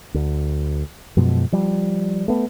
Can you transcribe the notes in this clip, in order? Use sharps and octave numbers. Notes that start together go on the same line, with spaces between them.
D2
F#2 B2 F3 G#3
F3 G3
A3 B3